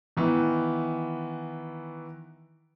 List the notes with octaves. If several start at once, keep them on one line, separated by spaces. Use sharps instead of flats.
D#3 E3 B3